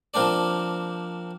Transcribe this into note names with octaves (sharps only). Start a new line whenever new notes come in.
F3 A#3 C4 D4 D5